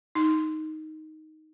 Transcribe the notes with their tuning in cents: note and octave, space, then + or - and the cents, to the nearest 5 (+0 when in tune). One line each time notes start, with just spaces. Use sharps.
D#4 +5